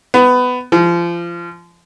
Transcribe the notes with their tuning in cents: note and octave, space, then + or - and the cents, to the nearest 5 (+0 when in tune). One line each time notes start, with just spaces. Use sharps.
B3 +15
F3 -30